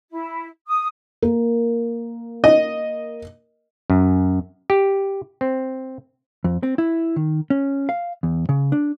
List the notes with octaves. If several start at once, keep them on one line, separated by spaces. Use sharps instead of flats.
E4
D#6
A#3 A#4
D#5
F#2
G4
C4
F2
C4
E4
D#3
C#4
F5
E2
C#3
D4